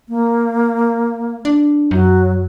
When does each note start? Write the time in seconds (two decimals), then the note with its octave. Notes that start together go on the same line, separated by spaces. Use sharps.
0.09 A#3
1.45 D4
1.91 F#2 F#3